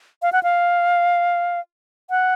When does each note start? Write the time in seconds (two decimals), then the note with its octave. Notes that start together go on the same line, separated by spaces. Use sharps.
0.22 F5
0.33 F#5
0.43 F5
2.10 F#5